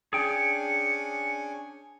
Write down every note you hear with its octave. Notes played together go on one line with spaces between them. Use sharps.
C#4 D4 G#4 G5 G#5 C#7